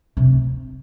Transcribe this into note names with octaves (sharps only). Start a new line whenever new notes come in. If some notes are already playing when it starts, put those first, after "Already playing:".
C3